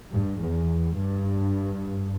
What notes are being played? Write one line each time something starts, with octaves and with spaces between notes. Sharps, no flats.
G2
E2
G2